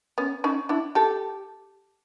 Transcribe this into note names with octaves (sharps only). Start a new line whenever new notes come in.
B3 C#4
C#4 D#4
D4 E4
G4 A4